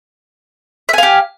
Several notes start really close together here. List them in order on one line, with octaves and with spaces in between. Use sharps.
E5 G#5 F5 G4